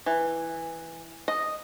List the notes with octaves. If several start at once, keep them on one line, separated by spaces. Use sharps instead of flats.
E3
D#5